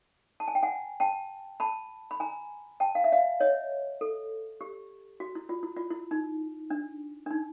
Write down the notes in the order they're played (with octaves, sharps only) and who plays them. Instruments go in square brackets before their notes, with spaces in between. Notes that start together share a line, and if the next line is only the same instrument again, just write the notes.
[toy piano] A5
G#5
G5
F#5 G#5
G5 A5
A5 B5
B5
G#5 A#5
G5 A5
F5
E5
D#5 F5
C#5 D#5
A4
G4
F#4
E4
F4
E4
F4
E4
D#4
D4
D4
D#4